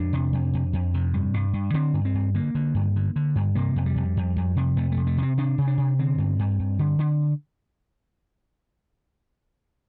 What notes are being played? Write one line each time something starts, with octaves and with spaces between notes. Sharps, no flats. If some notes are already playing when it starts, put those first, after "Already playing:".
Already playing: F2 D4
C3
F2
F2
F2
C3
G2
G2
G2
D3 C4
G2
C4
G2
D3 A#3
D3
G2
D3
D3
G2
C3 A#3
F2
G3
F2
F2
F2
C3
F2 A3
A3
C3
A3
C3
C4
C3 D4
C3
D4
C3
D3 C4
G2
G2
G2
D3
D3